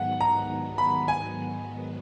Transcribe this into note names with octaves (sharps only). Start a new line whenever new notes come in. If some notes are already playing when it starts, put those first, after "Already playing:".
Already playing: G#2 D#3 F#3 B3 F#5
A#5
B5
G#5